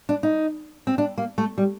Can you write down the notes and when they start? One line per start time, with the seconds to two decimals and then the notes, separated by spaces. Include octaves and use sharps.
0.09 D4
0.23 D#4
0.87 C4
0.98 D4
1.18 A#3
1.38 A3
1.58 G3